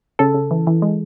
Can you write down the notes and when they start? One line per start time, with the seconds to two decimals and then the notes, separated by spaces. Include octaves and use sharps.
0.19 C#3 A4
0.34 C#3
0.51 E3
0.67 E3
0.82 G#3